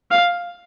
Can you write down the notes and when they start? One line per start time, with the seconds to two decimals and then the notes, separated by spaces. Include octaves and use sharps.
0.11 F5